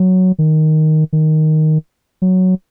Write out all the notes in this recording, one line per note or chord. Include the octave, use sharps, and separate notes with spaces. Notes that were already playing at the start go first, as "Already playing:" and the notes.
Already playing: F#3
D#3
D#3
F#3